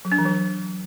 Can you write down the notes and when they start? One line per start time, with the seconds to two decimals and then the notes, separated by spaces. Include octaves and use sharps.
0.05 F#3
0.12 D4
0.18 E3
0.25 F#3